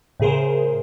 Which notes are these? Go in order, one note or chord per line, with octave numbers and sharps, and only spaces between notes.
A2 C#3 G#4 A#4 C5